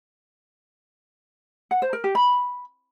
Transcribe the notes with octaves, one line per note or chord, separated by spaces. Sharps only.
F#5
C5
A#4
G4
B5